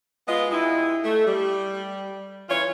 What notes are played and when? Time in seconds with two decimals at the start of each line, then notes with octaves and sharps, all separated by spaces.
0.28 G#3 B3 F4 D#5
0.51 G2 G#3 E4
1.04 A3
1.26 G3
2.50 E3 F4 C#5